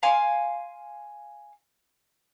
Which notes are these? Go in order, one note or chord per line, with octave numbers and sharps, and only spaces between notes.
F5 G#5 C6